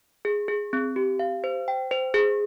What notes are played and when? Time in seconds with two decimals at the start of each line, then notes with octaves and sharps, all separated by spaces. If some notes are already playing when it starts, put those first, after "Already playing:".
0.25 G#4
0.48 G#4
0.73 C4
0.96 G4
1.19 F5
1.44 C5
1.68 G5
1.91 C5
2.14 G#4